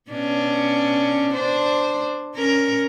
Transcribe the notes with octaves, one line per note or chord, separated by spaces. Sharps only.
B2 C#4 D4
D4 C5
C#4 A#4